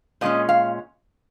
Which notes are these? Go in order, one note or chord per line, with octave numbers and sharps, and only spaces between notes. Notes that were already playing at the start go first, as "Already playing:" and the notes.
A#2 G#3 C#4 D#5
F5